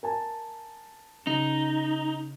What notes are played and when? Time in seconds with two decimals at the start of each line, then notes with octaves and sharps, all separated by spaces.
0.03 A#4 G#5 A5
1.27 C#3 D#4